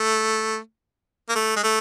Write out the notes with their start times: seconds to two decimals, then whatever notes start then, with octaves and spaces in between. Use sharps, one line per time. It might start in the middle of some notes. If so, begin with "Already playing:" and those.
Already playing: A3
1.29 A#3
1.35 A3
1.56 G#3
1.63 A3